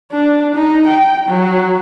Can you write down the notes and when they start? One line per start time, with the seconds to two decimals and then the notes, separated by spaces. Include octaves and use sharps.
0.12 D4
0.55 D#4
0.87 G5
1.27 F#3